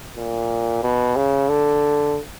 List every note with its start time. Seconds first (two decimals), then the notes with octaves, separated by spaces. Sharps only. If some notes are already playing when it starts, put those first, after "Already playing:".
0.16 A#2
0.83 B2
1.16 C#3
1.49 D3